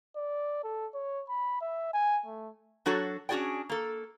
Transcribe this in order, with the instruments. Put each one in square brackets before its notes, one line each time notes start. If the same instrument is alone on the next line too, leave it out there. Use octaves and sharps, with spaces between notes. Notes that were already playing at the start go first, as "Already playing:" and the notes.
[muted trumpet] D5
A4
C#5
B5
E5
G#5
A3
[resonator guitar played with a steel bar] F#3 D4 F#4 A4 C#5
C#4 D4 F#4 G#4 D5 G5
A#3 A4